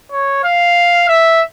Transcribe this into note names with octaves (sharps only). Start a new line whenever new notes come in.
C#5
F5
E5